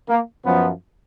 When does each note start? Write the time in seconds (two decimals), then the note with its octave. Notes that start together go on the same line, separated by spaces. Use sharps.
0.09 A#3
0.45 F#2 F3 B3